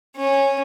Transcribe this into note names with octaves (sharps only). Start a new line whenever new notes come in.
C#4